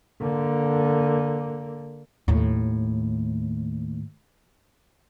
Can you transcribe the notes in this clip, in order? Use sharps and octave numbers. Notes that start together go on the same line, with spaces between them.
D3 A#3
D#2 A2